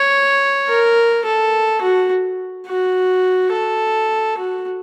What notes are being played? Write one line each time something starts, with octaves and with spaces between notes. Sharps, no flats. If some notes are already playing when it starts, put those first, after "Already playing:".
Already playing: C#5
A#4
A4
F#4
F#4
A4
F#4